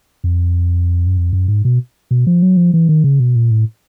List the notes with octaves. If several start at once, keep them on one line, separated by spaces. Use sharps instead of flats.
F2
F#2
F2
F#2
G#2
B2
B2
F3
F#3
F3
E3
D#3
C#3
B2
A#2
A2